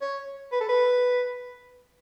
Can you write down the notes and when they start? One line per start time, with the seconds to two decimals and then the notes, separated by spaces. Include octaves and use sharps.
0.02 C#5
0.52 B4
0.61 A4
0.69 B4